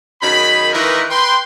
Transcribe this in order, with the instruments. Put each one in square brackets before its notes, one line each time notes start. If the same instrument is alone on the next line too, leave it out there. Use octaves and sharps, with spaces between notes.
[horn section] F#2 D#3 G#4 B5
D#3 E3 G#3 F4 A#4 B4
B4 G5 C6